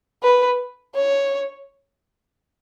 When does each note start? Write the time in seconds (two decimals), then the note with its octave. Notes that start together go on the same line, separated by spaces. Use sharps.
0.23 B4
0.95 C#5